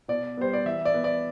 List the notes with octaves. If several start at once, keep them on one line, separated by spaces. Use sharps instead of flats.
B2 D5
G3 B3 C5
D5
E3 E5
D5
B3
D5